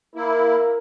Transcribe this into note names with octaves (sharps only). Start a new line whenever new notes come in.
A#3 E4 A#4